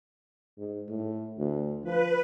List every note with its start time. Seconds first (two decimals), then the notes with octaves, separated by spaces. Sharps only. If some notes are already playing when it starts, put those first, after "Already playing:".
0.58 G#2
0.89 A2
1.38 D2
1.84 F3 B4